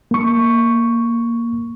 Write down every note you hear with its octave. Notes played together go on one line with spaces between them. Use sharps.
A#3 C#6